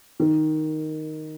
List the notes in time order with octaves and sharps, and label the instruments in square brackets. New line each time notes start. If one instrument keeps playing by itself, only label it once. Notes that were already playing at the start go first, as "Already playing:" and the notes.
[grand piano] D#3